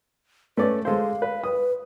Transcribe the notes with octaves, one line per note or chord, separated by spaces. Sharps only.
A3 C#4 B4 D5
G#3 A4 C5 F5
B4
B4 D#6